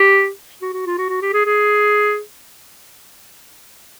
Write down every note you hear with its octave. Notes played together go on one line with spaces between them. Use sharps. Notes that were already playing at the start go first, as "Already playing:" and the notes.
Already playing: G4
F#4
F#4
F4
F#4
F#4
G4
G#4
G#4